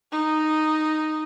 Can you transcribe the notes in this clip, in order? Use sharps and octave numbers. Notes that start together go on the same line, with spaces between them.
D#4